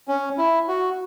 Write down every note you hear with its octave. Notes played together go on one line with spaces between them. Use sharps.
C#4
E4
F#4